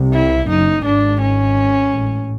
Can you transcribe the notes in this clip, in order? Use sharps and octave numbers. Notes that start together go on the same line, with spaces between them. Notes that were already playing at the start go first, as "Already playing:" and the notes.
Already playing: C2 C3
E4
F#1 F#2 D#4
G#1 G#2 D4
C#4
A1 A2